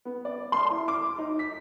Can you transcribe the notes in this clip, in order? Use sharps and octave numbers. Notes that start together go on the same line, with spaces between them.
B3
D5
C6
E4
D6
D#4
B6